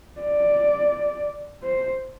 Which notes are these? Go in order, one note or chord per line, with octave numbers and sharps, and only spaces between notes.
D5
C5